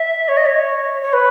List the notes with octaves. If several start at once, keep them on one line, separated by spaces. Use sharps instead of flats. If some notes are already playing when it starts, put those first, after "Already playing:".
Already playing: E5
C#5
D#5
C#5
C#5
B4